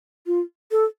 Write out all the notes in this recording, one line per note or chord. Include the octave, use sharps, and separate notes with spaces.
F4
A4